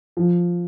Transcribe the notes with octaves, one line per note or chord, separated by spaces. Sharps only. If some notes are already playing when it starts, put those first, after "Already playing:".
F3